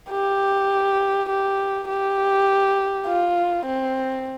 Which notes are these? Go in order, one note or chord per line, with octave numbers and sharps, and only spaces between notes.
G4
G4
G4
F4
C4